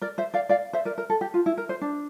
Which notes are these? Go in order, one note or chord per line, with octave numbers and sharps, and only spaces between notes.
A#4 D5
C5 E5
D5 F5
D5 F5
C5 E5
A#4 D5
A#4
A4
G4
F4
E4
A#4
C5
D4